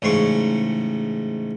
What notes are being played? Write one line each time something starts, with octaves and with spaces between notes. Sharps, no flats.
A1 G#2 C#3 C6 C#6